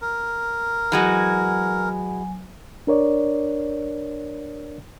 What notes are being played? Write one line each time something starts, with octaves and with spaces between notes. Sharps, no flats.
A#4
E3 F#3 G#3 F#4 G#5
D4 A#4 C#5 D5